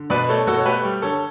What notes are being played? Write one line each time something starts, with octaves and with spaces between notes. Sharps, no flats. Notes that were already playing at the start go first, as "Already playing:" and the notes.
Already playing: D3
B2 B4 D5
A3 A4 C#5
B2 F#4 A4
C#5
A3 G4 B4
G3
D3 A4 C#5